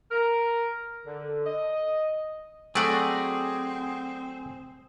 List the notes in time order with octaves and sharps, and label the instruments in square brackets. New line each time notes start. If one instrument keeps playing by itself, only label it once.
[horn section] A#4
D3
D#5
[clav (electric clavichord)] F#3 A3 [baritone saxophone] C4 [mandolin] F#4 D5 [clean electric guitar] G#4